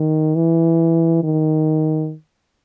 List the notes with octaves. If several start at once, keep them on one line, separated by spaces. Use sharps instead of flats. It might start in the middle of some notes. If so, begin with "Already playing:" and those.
Already playing: D#3
E3
D#3